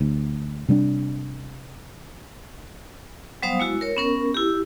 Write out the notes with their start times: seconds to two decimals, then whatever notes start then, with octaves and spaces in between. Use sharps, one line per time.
0.01 D2
0.69 C3 G3 C4 D4
3.43 F#3 G3 B3 C5 F5 D#6
3.60 G#3 E4 F#4
3.81 A#4 C#5
3.97 B3 C#4 A#4
4.34 E4 G4